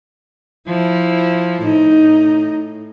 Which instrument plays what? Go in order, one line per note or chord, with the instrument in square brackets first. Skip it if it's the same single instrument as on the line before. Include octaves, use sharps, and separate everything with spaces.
[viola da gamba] F3 E4
[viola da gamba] A2 [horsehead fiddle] D#4